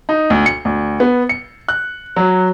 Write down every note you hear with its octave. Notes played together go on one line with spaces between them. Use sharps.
D#4
D2
C#7
D2
B3
C#7
F#6
F#3